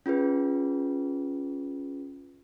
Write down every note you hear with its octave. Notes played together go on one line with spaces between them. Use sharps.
C#4 F4 G#4 B4